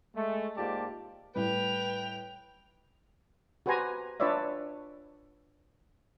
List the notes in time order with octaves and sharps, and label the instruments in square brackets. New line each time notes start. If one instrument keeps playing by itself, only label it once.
[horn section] G#3 A3
G#2 A#3 F4 G4 D5 A5
[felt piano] A2 G3 [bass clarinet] B4 [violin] G5 F7
[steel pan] F#4 G4 B4 C5 G#5 A#5
D4 F4 B4 C#5 D5 E5